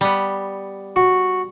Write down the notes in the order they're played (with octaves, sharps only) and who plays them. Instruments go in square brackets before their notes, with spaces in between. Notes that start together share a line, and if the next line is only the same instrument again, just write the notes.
[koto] G3 B3
[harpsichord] F#4